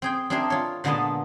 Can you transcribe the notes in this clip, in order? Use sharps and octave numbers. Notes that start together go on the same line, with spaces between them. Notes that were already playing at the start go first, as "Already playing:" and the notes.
C4 G#4 G5
C4 D4 G#4 A#4 E5 C6
F4 C#5
A#2 D3 G#3 B3 D#5 A5